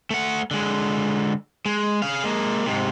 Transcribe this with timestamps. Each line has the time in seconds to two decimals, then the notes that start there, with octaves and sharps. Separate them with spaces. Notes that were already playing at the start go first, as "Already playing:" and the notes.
0.10 A3 F#5
0.51 D3 G#3
1.66 G#3
2.02 G#4 F5
2.24 G#3 A#3
2.66 G#2 C3